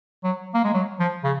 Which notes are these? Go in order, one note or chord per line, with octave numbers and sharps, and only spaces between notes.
F#3
A#3
G#3
F#3
F3
C#3